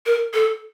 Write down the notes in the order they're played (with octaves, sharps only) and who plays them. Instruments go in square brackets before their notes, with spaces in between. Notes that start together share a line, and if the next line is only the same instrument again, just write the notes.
[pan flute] A#4
A4